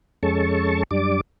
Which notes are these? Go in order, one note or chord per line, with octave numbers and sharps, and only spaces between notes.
F2 G#3 C#4 A4 A5 C#6
F#2 G3 D4 D5 D6